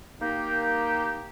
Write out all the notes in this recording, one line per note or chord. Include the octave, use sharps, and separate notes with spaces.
A#3 D#4 G4